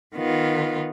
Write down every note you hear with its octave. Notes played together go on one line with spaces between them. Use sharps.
D#3 B3 F4